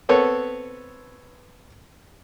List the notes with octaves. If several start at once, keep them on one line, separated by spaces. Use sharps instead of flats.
B3 C4 A4 B4 C#5